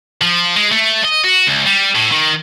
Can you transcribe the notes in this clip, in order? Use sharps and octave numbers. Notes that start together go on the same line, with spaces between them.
F3
G#3
A3
D#5
F#4
C#2
G3
A2
D#3